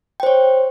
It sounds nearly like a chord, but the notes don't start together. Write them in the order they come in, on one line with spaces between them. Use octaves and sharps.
G5 C5 C#5